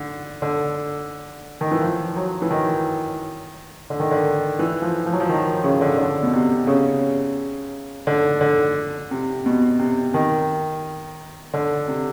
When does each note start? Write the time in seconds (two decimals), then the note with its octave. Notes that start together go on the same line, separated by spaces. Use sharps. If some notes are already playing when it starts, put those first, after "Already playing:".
Already playing: D3
0.42 D3
1.61 D#3
1.71 E3
1.81 F3
2.16 F#3
2.42 E3
2.50 D#3
3.90 D3
4.00 D#3
4.11 D3
4.59 E3
4.82 F3
5.06 F3
5.13 F#3
5.20 F3
5.29 D#3
5.64 C#3
5.81 D3
5.97 D3
6.23 B2
6.33 C3
6.67 C#3
8.07 D3
8.41 D3
9.11 C3
9.46 B2
9.79 C3
10.14 D#3
11.54 D3
11.88 C3